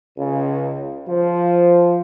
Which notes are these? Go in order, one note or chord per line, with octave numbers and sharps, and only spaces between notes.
C#2
F3